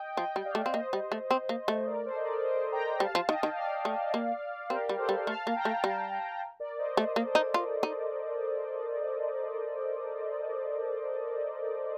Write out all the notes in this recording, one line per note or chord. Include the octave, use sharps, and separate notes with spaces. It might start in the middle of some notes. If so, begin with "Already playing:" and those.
Already playing: D#5 G5
F3 D#5 G5
G3
D5 F5
A3
C4
A#3 C5 D#5
G3
A3
C4
A#3
A3
A#4 D5
A4 C5
D#5
A#4 D5
C5 D#5
G5 A#5
G3 F5 A5
F3
D#3 D#5 G5
D#3
D5 F5
A3
A#3
C4 G4 A#4
G3
A4 C5
G3
A3 F5 A5
A#3
G5 A#5
A3
G3 F5 A5
A#4 D5
C5 D#5
A3 C5 D#5
A#3
A4 C5
D#4
F4
D#4